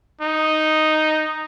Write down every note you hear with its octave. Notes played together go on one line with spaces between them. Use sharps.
D#4